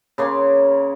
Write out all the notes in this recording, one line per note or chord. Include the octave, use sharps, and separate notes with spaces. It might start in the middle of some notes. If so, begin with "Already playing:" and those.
C#3 A#3 C6